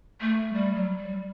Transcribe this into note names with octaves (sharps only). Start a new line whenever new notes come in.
A3
G3
F#3
G3